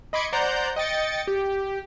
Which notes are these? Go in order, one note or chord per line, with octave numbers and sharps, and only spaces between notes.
D#5 B5 C6 D6 G#6 C#7
C5 D5 F#5 A#5 G6
D#5 G5 A6 C#7
G4